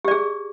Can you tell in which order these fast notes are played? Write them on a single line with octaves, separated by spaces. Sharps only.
G4 D5 G#4